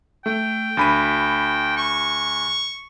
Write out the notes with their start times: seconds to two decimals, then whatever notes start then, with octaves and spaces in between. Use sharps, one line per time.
0.26 A3 G5
0.77 D2 B5 D#7
1.77 C#6